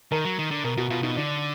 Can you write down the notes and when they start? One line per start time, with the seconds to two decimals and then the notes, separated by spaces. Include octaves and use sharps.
0.12 D#3 A#4
0.25 F#3
0.39 D#3
0.51 D3
0.64 B2 A#4
0.77 B2 F#4
0.90 B2 F4
1.03 B2 D#4
1.16 D3 D4